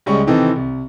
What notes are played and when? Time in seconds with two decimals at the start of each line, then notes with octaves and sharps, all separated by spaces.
0.06 C#2 G3 G#3 C#4 C#6
0.27 C3 D#3 E3 C4 D#4 A4
0.56 C2